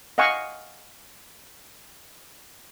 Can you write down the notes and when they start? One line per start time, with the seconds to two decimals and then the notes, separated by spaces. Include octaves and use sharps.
0.18 D#5 F5 F#5 G#5 C#6